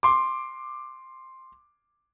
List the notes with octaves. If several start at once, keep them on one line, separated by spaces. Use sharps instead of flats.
C6 D6